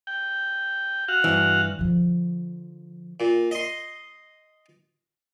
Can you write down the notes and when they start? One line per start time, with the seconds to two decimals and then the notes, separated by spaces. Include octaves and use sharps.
0.07 G5
1.08 F#4 F5 F#5
1.24 G2 E3
1.79 D3 F3
3.20 A#2
3.51 D#5 C6